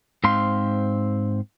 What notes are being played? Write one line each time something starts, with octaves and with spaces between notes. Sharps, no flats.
G#2 C4 C5 F5 C6